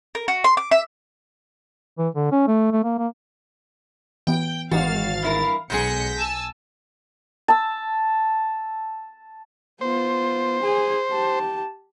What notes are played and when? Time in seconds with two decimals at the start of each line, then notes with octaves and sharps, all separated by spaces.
0.15 A#4
0.28 F#4
0.44 C6
0.57 D6
0.71 E5
1.98 E3
2.15 D3
2.32 C#4
2.48 A3
2.72 A3
2.84 A#3
2.99 A#3
4.27 E3 B3 G5
4.71 G#1 E3 F#4 F5 A6
5.22 G2 E4 A#4
5.70 B1 F#3 G#3 G#4 G6 A#6 B6 C#7
6.17 G#5 A5 E6
7.48 A5 E6
9.81 B3 F4 C5
10.62 G#4 G#5
11.11 G4 A5